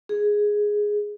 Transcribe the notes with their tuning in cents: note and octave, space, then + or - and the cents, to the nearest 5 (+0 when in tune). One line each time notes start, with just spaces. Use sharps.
G#4 +0